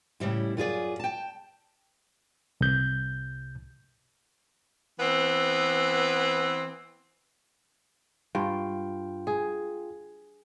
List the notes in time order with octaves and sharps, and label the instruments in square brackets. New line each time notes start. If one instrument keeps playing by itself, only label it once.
[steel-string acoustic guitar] A2 C#3 G3 E4
F#2 F4 G#4 D5
G5 A5
[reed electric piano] C2 G6
[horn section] E3 B3 C4
[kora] G2 [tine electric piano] F4 G5
[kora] G#4